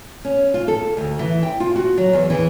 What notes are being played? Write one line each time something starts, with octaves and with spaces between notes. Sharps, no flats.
C#4
F4
A4
D2
E3
G5
F4
F#4
F#3
E2
E3